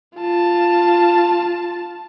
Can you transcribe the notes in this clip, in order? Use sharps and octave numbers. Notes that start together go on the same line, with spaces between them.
F4 A5